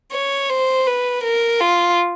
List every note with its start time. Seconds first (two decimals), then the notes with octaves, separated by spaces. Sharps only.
0.12 C#5
0.49 C5
0.87 B4
1.23 A#4
1.60 F4